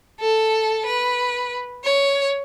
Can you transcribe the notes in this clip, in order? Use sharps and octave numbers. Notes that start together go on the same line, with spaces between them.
A4
B4
C#5